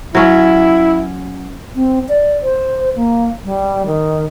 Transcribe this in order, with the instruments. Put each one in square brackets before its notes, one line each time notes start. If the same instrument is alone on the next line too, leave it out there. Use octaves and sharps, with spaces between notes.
[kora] F#3 C#4 [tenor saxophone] E4
[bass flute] C4
D5
C5
A#3
G3
D#3